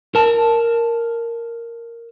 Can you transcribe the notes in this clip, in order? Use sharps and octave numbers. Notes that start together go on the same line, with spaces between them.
A#4 A5